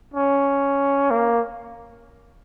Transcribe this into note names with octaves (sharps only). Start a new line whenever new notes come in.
C#4
A#3